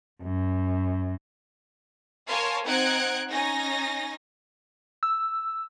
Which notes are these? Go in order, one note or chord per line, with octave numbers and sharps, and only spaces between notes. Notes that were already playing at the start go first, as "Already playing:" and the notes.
F#2
A#4 C#5 F5 G#5 A5 C6
C4 D#4 F#5 F#6 G#6 D7
C#4 D#4 G#5 A#6
E6